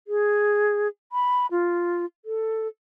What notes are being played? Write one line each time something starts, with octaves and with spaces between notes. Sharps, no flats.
G#4
B5
F4
A4